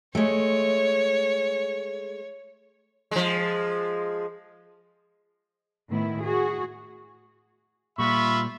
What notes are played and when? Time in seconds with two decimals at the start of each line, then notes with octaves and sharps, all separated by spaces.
0.15 G#3 A3 C#5
3.11 F3 G#3
5.89 A2 D#3 B3 E4
6.22 F#4 G#4
7.98 A#2 G3 F4 E5 B5 C#6